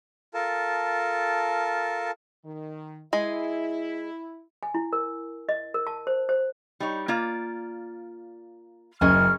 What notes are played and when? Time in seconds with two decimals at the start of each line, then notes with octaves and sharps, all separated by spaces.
0.34 F4 A4 A#4 A5
2.44 D#3
3.13 G#3 E4 G#4
4.63 G#5
4.74 E4
4.93 A#4
5.49 D#5
5.74 A#4
5.87 A5
6.07 C5
6.29 C5
6.80 G3 D#4 C#5
7.08 A#3 F4 D5
9.01 F#1 C#4 G#4 D#5 F6